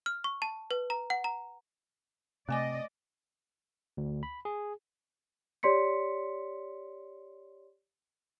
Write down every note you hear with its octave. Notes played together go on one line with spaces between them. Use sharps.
F6
C#6
A5
B4
A#5
F#5
A#5
C3 A3 D5 D#5 G#5 D6
D2
B5
G#4
G4 C#5 D5 C6 B6 C#7